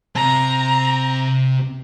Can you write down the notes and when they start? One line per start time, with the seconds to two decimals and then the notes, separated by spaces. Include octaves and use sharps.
0.15 C3 C4 A#5